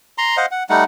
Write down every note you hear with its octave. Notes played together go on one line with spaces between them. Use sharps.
A#5 C6
C5 D#5 F5 F#5
F#5
G3 A3 D#4 F#5